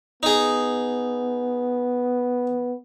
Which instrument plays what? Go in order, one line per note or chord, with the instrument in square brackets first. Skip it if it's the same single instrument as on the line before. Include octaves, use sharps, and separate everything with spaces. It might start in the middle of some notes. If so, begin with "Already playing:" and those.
[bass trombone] B3 [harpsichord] D#4 G#4